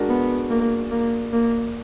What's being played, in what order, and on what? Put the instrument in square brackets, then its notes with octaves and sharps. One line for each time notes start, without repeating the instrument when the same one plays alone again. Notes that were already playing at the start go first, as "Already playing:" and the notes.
Already playing: [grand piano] G#3 D4 F#4 A#4 D5
[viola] B3
A#3
A#3
A#3